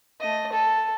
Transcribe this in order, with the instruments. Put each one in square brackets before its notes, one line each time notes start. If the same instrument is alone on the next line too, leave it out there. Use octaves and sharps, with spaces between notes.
[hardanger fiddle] A3 D#5
A4